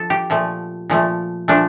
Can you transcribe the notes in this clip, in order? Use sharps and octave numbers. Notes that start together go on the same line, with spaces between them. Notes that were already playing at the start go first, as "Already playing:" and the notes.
Already playing: F3 A4
G4
A#2 F3 A3
A#2 F3 A3
A#2 F3 A3 D4